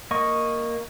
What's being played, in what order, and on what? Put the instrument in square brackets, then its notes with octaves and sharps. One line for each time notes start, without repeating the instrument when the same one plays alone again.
[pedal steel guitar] A#3 D#5 C#6